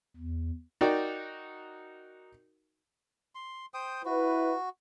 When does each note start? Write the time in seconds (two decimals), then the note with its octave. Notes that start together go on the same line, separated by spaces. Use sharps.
0.16 E2
0.81 D#4 F#4 A#4 D5 G5
3.35 C6
3.74 C5 G5 D#6
4.05 E4 F#4 B4